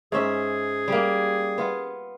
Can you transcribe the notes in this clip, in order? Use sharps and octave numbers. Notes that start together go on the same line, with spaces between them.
G#2 C#4 G#4 E5
G3 A#3
B3 F4